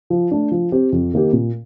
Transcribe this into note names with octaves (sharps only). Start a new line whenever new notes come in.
F3
A3 D4
F3
C4 G4
F2
D#3 A#3 D#4 G4
A#2